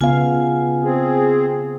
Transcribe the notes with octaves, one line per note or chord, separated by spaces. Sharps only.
C#3 B3 F4 F5 G#5
C4 G#4